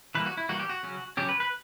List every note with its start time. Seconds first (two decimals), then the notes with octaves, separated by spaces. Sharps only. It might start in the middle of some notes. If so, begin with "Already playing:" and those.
0.15 E3 G3 A#3 B4
0.26 F#4
0.37 E4
0.49 E3 G3 A#3 F#4
0.60 G4
0.69 F#4
0.83 C#3 F#3 C#4
1.17 C#3 F#3 C#4 G4
1.29 B4
1.40 B4